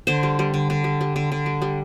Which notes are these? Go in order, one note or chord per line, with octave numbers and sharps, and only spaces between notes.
D3 C5
G3
G3
D3
D3
G3
G3
D3
D3
G3
G3